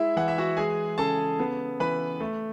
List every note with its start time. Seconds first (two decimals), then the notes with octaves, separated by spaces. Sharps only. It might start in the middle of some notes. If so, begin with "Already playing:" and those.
Already playing: G#3 E4 E5
0.16 E3 F#5
0.28 E5
0.38 F#4 F#5
0.57 G#3 G#4 G#5
0.98 C#3 A4 A5
1.40 B3
1.80 E3 B4 B5
2.20 A3